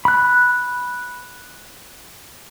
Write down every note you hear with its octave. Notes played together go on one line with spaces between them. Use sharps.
B5 F#6